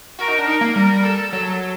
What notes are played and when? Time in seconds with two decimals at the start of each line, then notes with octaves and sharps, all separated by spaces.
0.19 F#4 A#4
0.28 D#4
0.39 D4
0.47 D#4 A#4
0.61 A#3
0.75 G3 A#4
1.03 A4
1.32 F#3 A4